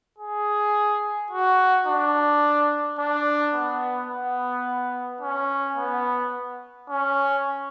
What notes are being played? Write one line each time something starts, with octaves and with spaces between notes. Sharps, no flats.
G#4
F#4
D4
D4
B3
B3
C#4
B3
C#4